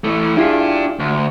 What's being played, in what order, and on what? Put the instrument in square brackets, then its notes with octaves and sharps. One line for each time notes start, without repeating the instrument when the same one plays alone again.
[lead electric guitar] E3 A3
[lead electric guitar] D4 G4 [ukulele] E4 F4 G#4
[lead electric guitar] D2